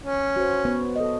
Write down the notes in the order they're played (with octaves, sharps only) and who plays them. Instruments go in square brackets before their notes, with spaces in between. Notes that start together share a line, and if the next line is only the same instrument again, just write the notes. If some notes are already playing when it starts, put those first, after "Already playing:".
[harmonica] C#4
[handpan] F#4 C5
B3 B4 C#5
A4 D#5